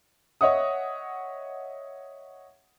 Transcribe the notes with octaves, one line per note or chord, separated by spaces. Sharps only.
C#5 D#5 E5 F#5 D#6